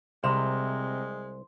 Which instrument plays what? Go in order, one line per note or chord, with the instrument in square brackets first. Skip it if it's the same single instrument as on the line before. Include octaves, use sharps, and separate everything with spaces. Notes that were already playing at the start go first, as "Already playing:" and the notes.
[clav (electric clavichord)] C2 [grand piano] C3 E7 [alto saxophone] G#3 [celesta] C6